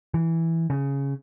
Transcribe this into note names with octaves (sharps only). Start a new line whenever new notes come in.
E3
C#3